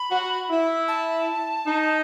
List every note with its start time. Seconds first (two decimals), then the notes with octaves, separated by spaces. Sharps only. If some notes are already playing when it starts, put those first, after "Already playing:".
Already playing: B5
0.11 F#4
0.50 E4
0.88 A5
1.66 D#4